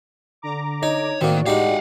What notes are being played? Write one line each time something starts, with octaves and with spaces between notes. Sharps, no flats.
D3 A#5 D6
D#4 C#5
A2 D#3 A#3 C4 F#4 D5
G#3 D#4 G4 F5 F#5